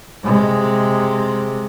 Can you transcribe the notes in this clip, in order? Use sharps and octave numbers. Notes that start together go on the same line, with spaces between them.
C3 G#3